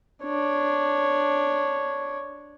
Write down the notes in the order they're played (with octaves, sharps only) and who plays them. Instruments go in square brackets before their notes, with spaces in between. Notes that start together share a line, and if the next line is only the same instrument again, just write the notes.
[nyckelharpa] D4 C#5